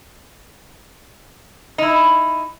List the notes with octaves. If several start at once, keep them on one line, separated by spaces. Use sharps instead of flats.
D#4 E4